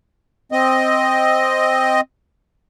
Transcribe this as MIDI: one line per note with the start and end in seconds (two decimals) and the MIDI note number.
0.52 2.01 60
0.52 2.01 75